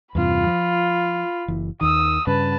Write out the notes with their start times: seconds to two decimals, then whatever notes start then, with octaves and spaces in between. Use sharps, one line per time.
0.15 E2 G2 C3 F4 B5
0.47 F3
1.48 F#1 E3
1.81 D#2 D#3 D#6 E6
2.27 G2 C#3 B4 A5